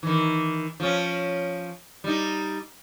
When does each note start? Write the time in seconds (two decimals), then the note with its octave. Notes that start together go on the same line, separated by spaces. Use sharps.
0.03 D#3 E3
0.80 F3 C#4
2.04 G3 D#4